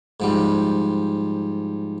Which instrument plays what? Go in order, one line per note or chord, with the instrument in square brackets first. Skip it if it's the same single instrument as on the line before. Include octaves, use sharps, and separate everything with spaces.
[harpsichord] G#2 F3 G3